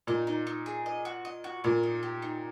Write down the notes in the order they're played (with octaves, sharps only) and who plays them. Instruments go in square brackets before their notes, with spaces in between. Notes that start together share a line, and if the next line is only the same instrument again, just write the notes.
[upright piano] A#2 [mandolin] D#4
[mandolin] D#4
D#4
G#4
D#5
F#4
D#5
F#4
[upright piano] A#2 [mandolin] A#4
[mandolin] D#4
G4
D#4